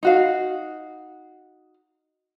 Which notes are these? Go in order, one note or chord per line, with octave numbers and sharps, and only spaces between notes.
D#4 F#4 F5